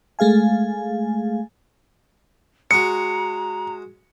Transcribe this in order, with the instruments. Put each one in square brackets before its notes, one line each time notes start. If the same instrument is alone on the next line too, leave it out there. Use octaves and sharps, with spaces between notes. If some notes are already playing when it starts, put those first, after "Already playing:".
[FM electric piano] G#3 A3 G#4 F5 G#5
[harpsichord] G#3 F#4 [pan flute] A#5 [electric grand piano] C#7